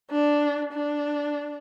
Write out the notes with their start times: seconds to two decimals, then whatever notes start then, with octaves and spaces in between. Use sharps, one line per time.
0.11 D4
0.72 D4